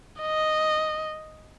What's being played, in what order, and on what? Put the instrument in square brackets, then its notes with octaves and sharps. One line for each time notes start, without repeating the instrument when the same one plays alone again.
[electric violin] D#5